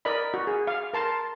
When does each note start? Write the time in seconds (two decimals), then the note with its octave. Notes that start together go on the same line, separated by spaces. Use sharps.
0.05 A#4 D5 D#5 B5
0.34 F#4
0.47 G#4
0.67 F5
0.94 A#4 A5 C6